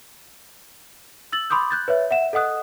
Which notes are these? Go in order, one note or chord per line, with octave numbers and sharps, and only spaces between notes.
E6 A6 F#7
B5 C6 D6 D#6 G6
F#6 G6 A6
B4 C#5 E5
E5 F#5 E7
A4 D#5 F#5 D#6 F#6